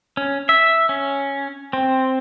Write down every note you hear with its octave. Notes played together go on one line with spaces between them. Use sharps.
C#4
E5
C#4
C4